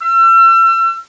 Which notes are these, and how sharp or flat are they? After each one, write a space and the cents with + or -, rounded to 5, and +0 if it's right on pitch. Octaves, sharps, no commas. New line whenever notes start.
E6 +40